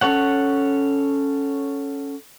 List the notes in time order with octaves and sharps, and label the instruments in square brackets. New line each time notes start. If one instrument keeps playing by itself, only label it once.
[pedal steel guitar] C#4 A4 C#5 F#5